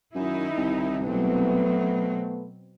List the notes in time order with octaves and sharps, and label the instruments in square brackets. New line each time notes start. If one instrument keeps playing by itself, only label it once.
[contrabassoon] F#2 [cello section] D#3 D#4 E4
[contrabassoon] C2
[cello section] B2 F#3 C4 [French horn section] A3 B3